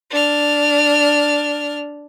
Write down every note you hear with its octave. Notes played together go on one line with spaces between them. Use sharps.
D4 F6